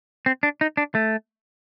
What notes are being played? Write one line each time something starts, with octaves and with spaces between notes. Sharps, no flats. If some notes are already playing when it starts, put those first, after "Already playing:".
C4
D4
D#4
D4
A3